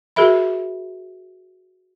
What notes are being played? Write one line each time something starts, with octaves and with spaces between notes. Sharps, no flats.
F#4 G#4 A#4 E5 B5